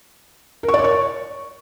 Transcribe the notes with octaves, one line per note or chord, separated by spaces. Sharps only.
A#4
C#6
D5
C#5
C#6